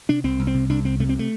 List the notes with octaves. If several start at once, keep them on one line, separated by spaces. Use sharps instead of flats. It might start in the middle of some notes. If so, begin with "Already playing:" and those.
C3 D4
C2 C4
C2
C4
C3
C2 D4
C2 C4
C3 A3
C4
A3